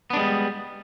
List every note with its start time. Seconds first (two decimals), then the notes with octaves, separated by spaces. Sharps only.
0.10 B3
0.13 D4
0.16 G#3
0.19 G3